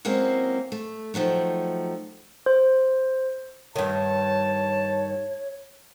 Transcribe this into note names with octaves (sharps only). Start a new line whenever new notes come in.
F#3 G#3 A#3 C4 C#4 E4
A3
D#3 F3 F#3 A3
C5
G2 D#3 C#5 A5